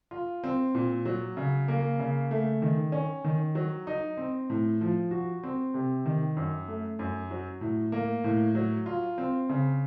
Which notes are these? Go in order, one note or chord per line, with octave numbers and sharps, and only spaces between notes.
F4
C4
A#2
F#3
C#3
A#3
C#3
A3
D#3
C#4
D#3
F#3
D#4
C4
A2
F3
F#4
C4
C3
D#3
F#2
A3
F#2
F#3
A2
A#3
A2
F#3
F4
C4
C#3